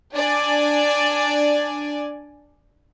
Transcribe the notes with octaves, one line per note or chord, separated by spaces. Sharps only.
D4 D5 G#5